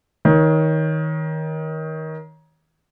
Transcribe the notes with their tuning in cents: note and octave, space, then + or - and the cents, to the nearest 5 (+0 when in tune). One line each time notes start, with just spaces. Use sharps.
D#3 +20 C#5 +5